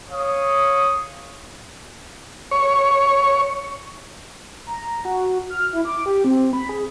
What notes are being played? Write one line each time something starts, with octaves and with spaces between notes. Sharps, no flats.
C#5 F5 D#6
C#5
A#5
F#4
F6
E4
D6
G4
C4
B5
G#4